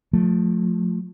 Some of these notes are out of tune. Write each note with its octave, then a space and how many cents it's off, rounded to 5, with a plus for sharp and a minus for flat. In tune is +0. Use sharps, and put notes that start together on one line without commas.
F3 +35 A3 +0